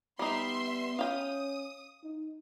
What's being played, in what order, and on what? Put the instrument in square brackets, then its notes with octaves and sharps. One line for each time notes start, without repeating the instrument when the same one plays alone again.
[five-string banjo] G3 D#4 [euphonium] B3 [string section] E5 C6
[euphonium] C#4 [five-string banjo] F5 G5 [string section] D#6
[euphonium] D#4